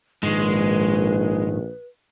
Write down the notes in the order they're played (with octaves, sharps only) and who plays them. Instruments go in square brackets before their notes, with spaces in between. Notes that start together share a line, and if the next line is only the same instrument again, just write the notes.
[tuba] A#1 [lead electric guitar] G#2 D#3 [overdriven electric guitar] G#3 [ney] B4